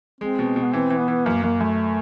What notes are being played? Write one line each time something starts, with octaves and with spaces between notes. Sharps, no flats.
G#3 C4
B2
B2
B3
E3 C4
E3
B3
E3
F#2 A#3
F#2 A#3
F#2 A3